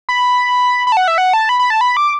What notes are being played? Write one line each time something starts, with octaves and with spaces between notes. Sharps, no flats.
B5
B5
A5
F#5
E5
F#5
A5
B5
B5
A5
B5
D6